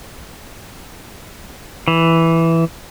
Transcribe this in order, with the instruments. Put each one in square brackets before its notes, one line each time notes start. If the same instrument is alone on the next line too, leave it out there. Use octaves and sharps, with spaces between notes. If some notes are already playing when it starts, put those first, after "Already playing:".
[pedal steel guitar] E3